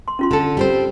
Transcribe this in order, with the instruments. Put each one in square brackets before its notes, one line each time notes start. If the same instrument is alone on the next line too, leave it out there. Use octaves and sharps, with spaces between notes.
[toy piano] C6
C#4 F4 C6
[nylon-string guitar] D3 A4
G3 C4 C5